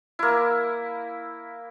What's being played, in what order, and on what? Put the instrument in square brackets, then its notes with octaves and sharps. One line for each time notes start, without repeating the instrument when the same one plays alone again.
[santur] A#3 E4